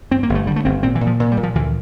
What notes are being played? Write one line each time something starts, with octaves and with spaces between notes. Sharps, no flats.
G2 C4
A#3
G1
A3
D3 G3
A3
G1 C4
A#2 C4
E3
A#2
F3
A#2
G3
A#2
F3
D2 E3